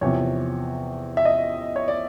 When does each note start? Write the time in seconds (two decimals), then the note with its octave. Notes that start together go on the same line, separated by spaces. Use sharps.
0.01 E2 C3 F3 C#5
1.17 E5
1.25 D#5
1.76 C#5
1.88 D5